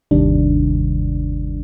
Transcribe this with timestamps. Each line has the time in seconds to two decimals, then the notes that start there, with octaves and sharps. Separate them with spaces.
0.11 G1 D#2 C3 D#3 G3 D4